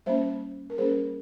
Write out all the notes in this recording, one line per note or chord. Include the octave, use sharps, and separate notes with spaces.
G3 A#3 C#4 C5 E5
A#4
G3 A#3 C#4 G#4 C5